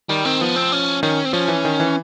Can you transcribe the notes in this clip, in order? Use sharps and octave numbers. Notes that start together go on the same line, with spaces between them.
D#3 G3
D#3 C4
F3 B3
C4
C#4
D#3 C#4
C4
F3 C#4
E3
D#3
E3